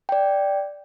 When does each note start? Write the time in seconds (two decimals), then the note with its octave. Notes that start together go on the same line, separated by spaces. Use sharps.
0.09 D5 G5